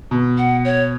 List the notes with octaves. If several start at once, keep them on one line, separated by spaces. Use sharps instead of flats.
B2
F#5
C#5